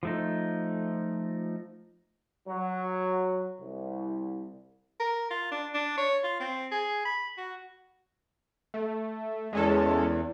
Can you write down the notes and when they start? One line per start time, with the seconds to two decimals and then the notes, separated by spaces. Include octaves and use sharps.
0.03 F3 A3 D#4
2.47 F#3
3.60 C2
5.00 A#4
5.31 F4
5.52 D4
5.74 D4
5.98 C#5
6.24 F4
6.40 C4
6.72 G#4
7.05 B5
7.38 F#4
8.74 A3
9.53 E2 G#3 C#4 A4